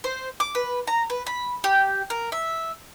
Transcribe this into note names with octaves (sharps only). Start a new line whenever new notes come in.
C5
D6
B4
A#5
B4
B5
G4
A#4
E5